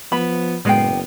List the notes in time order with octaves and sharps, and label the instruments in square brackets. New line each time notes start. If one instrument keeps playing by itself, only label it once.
[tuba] F3 [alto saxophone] B3 [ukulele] B5
[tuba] F#1 [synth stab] A2 G#3 C7 [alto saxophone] B3 [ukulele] D5 G5